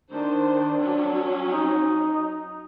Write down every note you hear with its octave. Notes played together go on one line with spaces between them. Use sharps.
D#3 D4 C5
F#3 C#4
D#4